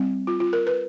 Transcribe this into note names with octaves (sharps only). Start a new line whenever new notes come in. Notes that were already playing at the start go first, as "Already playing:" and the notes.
Already playing: G3 C4
F4
F4
A#4
B4